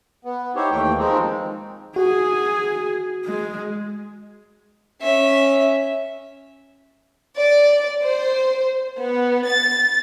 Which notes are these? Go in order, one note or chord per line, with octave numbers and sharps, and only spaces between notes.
B3
D#4 E4 G4 C5 C#5
D#2 E3 A3 G5
D#3 F3 G#3 C4 D#4
F#4 G#4
G#3
C#4 E5
D5
C5
B3
A6